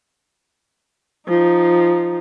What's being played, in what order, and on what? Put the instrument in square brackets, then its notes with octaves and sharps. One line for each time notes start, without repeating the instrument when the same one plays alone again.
[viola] F3 D#4